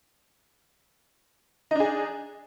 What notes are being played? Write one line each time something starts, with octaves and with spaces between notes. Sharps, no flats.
D4 D#4 G#4